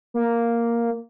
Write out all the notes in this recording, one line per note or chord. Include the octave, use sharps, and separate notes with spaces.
A#3